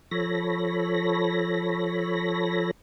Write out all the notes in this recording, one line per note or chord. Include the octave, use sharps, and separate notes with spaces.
F3 A4 C#5 B5 A#6